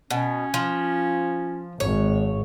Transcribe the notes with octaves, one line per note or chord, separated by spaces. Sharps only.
B2 C#4
F3
G#1 C#5